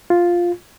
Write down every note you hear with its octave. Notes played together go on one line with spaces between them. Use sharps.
F4